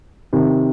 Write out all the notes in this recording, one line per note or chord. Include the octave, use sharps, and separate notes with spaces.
C3 D#3